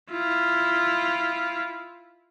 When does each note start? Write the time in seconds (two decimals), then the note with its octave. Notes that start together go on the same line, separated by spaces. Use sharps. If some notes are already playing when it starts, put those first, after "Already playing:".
0.11 E4 F4